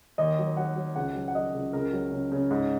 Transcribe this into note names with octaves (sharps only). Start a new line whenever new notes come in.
D#2 D#5
F#3
F#3 F#5
F#3
C#2 F#5
F#3
F#5
F#3 D#5
C#2
C#2 A#4
F#3
C#3
C#3
G#2